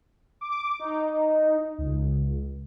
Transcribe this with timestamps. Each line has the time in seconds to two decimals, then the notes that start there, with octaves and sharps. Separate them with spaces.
0.41 D6
0.79 D#4
1.78 C#2